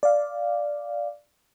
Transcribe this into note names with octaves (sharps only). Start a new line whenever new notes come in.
D5 F5